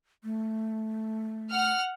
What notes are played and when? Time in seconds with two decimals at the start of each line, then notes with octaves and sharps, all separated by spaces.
0.24 A3
1.51 F#5 F6